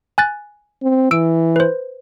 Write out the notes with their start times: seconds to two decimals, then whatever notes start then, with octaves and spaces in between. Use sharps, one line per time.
0.18 G#5 F#6 A6
0.82 C4
1.11 E3 E6 D7
1.56 B4 C5